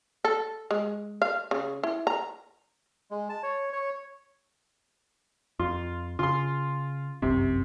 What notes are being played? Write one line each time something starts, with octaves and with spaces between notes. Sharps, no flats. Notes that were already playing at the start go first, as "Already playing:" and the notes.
A4
G#3
F5
C#3
E4
A#5
G#3
A5
C#5
C#5
F2 F4
C#3 F4 C6
G1 C2 F#2 C3